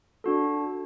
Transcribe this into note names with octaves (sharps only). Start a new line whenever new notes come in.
D4 F#4 A4